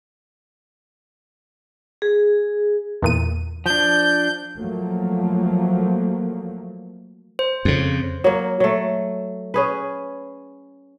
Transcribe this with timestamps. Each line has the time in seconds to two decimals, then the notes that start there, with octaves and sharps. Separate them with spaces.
2.02 G#4
3.02 E2 A#2 D#7
3.66 F3 D4 G6
4.59 F3 F#3 A3 A#3
7.39 C5
7.65 F2 C#3
8.24 F#3 A#3
8.60 F#3 A3
9.54 C#4 G#4 B4